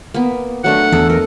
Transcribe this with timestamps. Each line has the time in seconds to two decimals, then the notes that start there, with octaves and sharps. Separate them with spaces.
0.14 A#3 B3
0.64 F#3 A3 D4 F#5
0.92 E2 A4
1.10 A#4 D#5